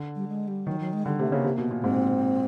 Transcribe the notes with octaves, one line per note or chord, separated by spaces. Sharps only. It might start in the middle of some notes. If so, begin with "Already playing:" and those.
Already playing: D3
G3
G#3
G3
D#3 F#3
F#3
G#3
D3 G3
C3 A3
C#3 A#3
C3
B2
A#2
G#2 C4